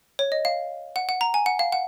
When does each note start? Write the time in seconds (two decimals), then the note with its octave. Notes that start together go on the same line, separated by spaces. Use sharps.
0.19 C#5
0.32 D#5
0.45 F5
0.96 F#5
1.09 F#5
1.21 A#5
1.34 G#5
1.46 F#5
1.59 F5
1.72 F#5